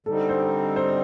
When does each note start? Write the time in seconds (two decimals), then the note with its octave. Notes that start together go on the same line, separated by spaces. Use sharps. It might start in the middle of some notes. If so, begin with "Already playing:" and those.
0.06 D3 G3 C4 D#4 A4
0.29 C5
0.76 C5